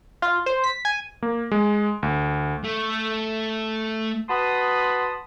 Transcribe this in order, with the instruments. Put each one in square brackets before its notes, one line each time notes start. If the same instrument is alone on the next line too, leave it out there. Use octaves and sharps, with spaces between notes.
[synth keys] F4
C5
B6
G#5
[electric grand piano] A#3
G#3
D2
[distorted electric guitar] A3
[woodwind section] F#4 B4 A5 B5 C6 D#6